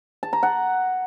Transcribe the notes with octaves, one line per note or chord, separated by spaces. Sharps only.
A5
A#5
F#5